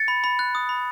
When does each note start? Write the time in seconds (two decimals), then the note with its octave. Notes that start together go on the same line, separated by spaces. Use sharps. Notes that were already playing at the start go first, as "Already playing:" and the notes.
Already playing: A6 C#7
0.08 B5
0.24 B5
0.39 F#6
0.55 D#6
0.69 B5